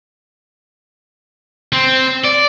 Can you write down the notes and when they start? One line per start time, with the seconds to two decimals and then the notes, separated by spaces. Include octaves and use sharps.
1.73 C4
2.24 D5